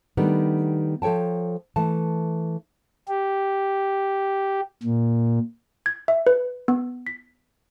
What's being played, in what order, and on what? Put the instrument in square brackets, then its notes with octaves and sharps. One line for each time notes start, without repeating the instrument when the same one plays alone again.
[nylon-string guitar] D#3 G3 A3 B3 D4 D#4
F3 A4 C#5 G5 A5
E3 A3 A5
[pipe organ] G4
A#2
[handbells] G#6
E5
B4
B3
B6